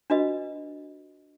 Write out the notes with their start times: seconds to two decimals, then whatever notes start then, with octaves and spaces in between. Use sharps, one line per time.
0.10 D4 F4 F#4 B4 D#5